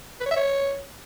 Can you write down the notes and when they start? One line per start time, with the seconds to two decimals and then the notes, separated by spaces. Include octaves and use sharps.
0.21 B4
0.26 C#5
0.31 E5
0.37 C#5